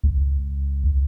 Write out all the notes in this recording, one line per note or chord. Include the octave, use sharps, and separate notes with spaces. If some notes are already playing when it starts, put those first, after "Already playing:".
C#2